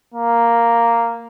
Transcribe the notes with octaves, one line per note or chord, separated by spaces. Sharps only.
A#3